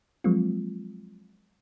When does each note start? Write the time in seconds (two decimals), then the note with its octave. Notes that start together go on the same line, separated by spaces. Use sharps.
0.24 F3 F#3 G#3 A#3 C4 F4